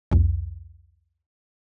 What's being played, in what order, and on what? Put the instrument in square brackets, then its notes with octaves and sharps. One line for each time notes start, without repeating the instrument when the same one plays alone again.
[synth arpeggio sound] C2 F2